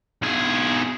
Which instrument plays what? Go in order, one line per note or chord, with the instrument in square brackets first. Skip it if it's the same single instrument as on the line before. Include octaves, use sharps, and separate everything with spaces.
[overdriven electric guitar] B1 G#4